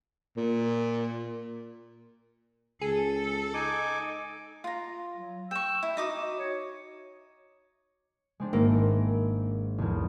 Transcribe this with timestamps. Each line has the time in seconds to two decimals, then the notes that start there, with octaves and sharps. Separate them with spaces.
0.37 A#2
2.81 C#2 G#4 A4
3.54 D#4 G#5 D6
4.64 F4 A#5
5.15 F#3
5.51 G5 C#6 E6
5.83 E4
5.97 D#4 F#4 D6 D#6
6.38 C#5
8.40 G#3 C4 D4
8.53 G#1 A#3 E5 D7
9.78 B1 E2